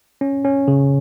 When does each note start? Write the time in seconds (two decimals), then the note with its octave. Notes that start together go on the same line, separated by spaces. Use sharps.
0.21 C#4
0.45 C#4
0.68 C#3